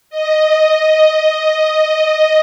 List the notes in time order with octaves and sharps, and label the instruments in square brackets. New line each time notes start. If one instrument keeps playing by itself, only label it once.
[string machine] D#5